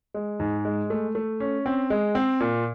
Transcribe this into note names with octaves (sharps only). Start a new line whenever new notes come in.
G#3
G#2
G#3
A3
A3
C#4
C4
G#3
C4
A#2